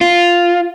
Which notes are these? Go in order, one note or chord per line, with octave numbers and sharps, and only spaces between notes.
F4